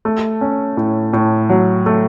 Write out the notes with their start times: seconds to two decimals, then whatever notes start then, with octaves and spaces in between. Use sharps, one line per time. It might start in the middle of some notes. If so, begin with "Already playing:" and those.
0.05 A3
0.41 C#4
0.77 A2
1.13 A2
1.50 F#3
1.86 A3